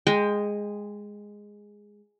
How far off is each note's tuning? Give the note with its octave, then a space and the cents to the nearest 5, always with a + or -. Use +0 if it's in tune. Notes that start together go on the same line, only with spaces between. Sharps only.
G#3 -5 G5 +20